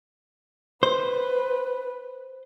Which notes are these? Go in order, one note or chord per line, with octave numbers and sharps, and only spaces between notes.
B4 C5